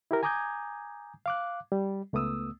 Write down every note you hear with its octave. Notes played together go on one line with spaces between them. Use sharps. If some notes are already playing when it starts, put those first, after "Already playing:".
E4 G4 A#4
G#5 A#5 D6 D#6 G6 G#6
F5 D6 F#6
G3
C#2 A3 B3 D#6 E6